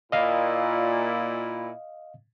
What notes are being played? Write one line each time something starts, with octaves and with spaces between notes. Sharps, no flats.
A#2 E4 D#5 F5 D#6